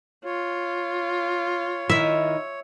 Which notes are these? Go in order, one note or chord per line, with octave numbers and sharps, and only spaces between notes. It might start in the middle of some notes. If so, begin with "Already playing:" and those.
F4 C#5
D#3 E4 E5